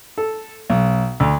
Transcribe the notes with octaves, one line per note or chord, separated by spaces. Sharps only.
A4
B1
D2